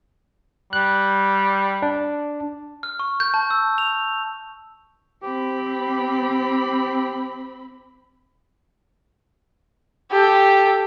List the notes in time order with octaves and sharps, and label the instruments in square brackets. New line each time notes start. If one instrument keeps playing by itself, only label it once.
[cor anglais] G3 [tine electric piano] F#6
[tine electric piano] D4
[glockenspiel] F6
C#6
G6
A5
E6
F7
[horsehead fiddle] C4 B5 [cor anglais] G4
[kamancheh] G4 A4